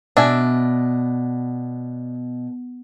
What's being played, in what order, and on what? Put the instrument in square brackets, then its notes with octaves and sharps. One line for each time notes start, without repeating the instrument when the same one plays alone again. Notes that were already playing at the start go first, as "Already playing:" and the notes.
[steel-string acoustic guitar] B2 [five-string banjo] D4 E5 G#5